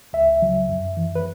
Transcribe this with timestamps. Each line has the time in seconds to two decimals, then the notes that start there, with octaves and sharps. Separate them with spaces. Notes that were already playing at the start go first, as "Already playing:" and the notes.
0.13 C#2 E5
0.42 C#3 F#3
0.69 F#2
0.97 E3
1.15 B4